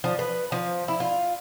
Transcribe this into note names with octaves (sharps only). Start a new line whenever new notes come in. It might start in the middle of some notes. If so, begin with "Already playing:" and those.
F3
B4
F3
E4
F4